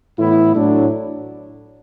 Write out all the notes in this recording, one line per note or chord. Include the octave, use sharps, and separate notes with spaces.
A2 E3 B3 E4
A2 F#3 D4